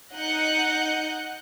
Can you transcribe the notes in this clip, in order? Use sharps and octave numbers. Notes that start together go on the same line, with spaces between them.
D#4 D#5 F#5 F#6 G6 C#7